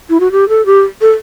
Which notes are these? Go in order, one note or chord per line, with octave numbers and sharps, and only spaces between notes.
E4
F#4
G4
A4
G4
A4